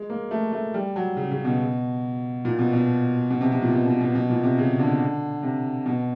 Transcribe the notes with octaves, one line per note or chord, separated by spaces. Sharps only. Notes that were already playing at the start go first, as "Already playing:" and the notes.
Already playing: G#3
A#3
A3
A3
G3
F#3
C#3
C#3
B2
A#2
B2
B2
B2
C3
C3
A#2
B2
B2
B2
B2
A#2
C3
C#3
D3
C3
B2